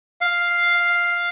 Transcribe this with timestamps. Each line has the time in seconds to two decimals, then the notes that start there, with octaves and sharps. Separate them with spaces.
0.21 F5